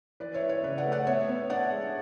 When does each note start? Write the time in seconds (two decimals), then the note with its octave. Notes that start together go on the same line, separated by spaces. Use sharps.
0.20 E3 B4 D5
0.34 C#5 E5
0.42 E3
0.49 C#5 E5
0.63 C#3 B4 D5
0.78 D5 F#5
0.85 A3
0.92 D5 F#5
1.07 B3 C#5 E5
1.29 B3
1.50 D4 D5 F#5
1.72 G#3